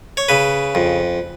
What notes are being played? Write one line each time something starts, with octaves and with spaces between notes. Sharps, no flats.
C#5
C#3 B4
F2